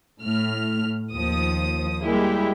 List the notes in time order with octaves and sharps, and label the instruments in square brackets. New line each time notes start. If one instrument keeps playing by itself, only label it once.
[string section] A2 F6
D#2 F3 D#6
G3 G#3 A#3 E4 G4